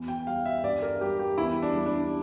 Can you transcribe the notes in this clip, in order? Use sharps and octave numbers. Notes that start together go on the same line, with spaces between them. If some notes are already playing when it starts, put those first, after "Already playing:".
Already playing: E2 E3
G5
G3 F5
E5
G2 D5
A#4
G3 G4
G4
E2 E4
D4
G3
D4